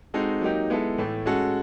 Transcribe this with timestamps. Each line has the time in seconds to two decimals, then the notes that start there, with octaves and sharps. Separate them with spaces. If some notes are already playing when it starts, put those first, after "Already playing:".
0.14 G#3 C4 D#4 F#4 A4
0.41 F#3 A#3 D#4 G4
0.70 G#3 B3 E4 A4
0.98 A2 E3 A3
1.26 G#3 C#4 F#4 A4